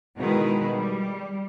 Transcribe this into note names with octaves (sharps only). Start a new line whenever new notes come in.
B2 D#3 G#3 E4 G#4 B4
G3